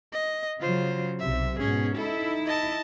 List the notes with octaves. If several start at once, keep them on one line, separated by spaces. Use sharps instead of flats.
D#5
C#3 F#3 F4 C5
B1 C3 E5
G#2 B2 C#4 G#4
D#4 E4 A4
D#5 A5